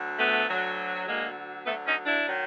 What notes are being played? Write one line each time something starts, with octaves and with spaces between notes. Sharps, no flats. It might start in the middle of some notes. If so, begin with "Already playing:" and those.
Already playing: D2 D3 F#3
A3 B3
D2 D3 F#3
D2 D3 F#3 G#3 A#3
D2 D3 F#3 A3 B3
C#4 D#4
D4 E4
D#3 F#3